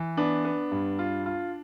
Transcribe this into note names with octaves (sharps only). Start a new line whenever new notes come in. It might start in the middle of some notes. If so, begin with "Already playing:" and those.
Already playing: E3
B3 D4
B3
G2
F4
F4